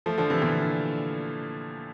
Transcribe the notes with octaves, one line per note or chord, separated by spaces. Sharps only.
F3 A3
D3 F3
C3 E3
A#2 D3